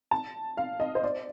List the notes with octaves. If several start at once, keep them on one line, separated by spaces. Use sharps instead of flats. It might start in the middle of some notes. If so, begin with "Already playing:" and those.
A5
F5
D#5
C5
D5